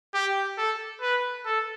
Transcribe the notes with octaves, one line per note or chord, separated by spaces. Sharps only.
G4
A4
B4
A4